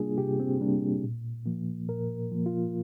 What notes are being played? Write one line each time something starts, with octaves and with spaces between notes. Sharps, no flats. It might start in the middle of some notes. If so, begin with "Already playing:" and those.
Already playing: C3 G3 A#3 D4 F4 G#4
C3 G4
C4
G3 A#3 D4
A#2
F3 A#3
A#2 A#4
F3 A#3
F4